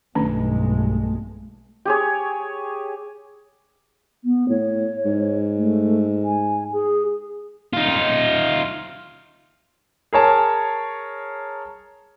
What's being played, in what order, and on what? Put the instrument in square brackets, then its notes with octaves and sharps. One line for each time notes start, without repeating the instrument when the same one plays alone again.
[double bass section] B1 G2 G#3 [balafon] D#3 C#4 D4 [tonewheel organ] A3
[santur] G4 G#4 C#5
[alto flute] B3
[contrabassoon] A2 [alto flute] C#5
[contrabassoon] G#2
[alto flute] A3
G#5
G#4
[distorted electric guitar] D#4 F4
[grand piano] G#4 A#4 C#5 A5